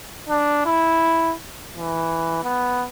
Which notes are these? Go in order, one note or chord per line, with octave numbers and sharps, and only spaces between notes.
D4
E4
E3
B3